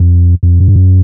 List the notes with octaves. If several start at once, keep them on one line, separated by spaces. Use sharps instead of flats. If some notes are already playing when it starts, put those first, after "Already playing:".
Already playing: F2
F2
F#2
G2
F#2